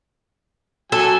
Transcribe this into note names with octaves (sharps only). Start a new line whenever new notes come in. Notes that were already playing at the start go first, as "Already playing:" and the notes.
F#3 A4 G#5